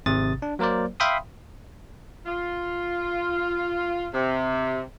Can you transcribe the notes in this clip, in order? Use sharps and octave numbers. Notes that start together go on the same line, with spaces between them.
G#1 C3 D#6 A6
D4
F#3 A#3 A#4 C5 D5
E5 F5 G5 B5 C6 D#6
F4
C3